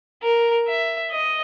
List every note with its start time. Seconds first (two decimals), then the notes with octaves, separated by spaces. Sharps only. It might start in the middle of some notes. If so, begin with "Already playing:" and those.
0.23 A#4
0.68 E5
1.11 D#5